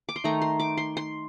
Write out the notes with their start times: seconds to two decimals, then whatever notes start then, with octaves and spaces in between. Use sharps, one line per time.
0.09 D6
0.16 C6
0.24 D#3 A3 D#4 A#5
0.42 C6
0.60 D6
0.77 C6
0.97 C6